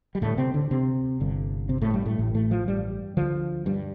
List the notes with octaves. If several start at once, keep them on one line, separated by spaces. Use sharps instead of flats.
G3
D2 A2 D3 A3
C3 C4
D3 D4
C3 C4
G1 G2 D3
C3 C4
A2 A3
G2 G3
A2 A3
A1 A2
A2 A3
F3
G2 G3
D2 D3 F3
G2 G3